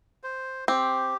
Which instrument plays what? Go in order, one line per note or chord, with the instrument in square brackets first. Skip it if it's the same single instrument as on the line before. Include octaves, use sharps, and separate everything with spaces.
[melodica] C5
[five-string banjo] C4 [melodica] G4